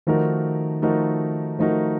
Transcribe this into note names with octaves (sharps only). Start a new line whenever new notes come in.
D#3 F3 A3 D#4 F#4 A#4
F3 A3 D#4 F#4 A#4
F3 A3 D#4 F#4 A#4